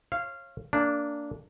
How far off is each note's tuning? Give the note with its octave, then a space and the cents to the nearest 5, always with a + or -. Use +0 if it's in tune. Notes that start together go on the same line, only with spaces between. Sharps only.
C#5 -35 F5 -15
A#3 -25 D4 -10